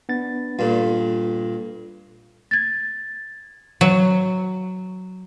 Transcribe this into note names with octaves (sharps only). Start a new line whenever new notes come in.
B3 D4 A6
G2 A#2 F4 A4
G#6 A6
F#3